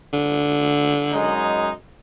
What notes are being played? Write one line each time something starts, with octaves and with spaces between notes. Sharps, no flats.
D3
F#2 G#3 D#4